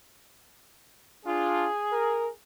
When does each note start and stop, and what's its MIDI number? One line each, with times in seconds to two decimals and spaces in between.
1.25 1.66 62
1.25 1.66 65
1.25 2.31 68
1.91 2.27 70